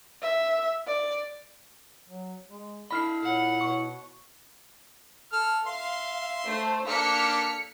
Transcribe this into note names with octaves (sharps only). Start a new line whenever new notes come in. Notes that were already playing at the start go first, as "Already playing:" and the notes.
E5
D5
F#3
G#3
E4 A4 D#5 B5 F6 C7
A#2 C#5 F#5
B2 C#6
A4 F6
E5 F5 C6
A3 C5
A#3 D4 A4 F6 B6 C#7